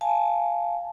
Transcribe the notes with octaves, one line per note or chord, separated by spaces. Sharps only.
F5 G#5 A5